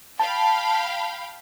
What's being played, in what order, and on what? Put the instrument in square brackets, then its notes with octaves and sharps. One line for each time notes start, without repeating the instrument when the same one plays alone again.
[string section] F5 G5 B5 [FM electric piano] A5